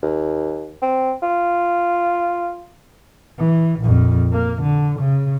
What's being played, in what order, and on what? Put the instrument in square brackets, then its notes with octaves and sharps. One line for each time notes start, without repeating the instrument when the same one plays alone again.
[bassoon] D#2
C4
F4
[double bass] E3
A#1 F2
A#3
D3
C#3